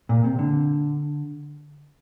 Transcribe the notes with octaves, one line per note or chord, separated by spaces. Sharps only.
A#2
C3
D3